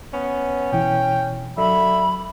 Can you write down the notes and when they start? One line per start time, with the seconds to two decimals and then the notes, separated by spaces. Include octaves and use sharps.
0.13 B3 C#4
0.72 B2 E3 G5
1.58 D3 F#3 E5 B5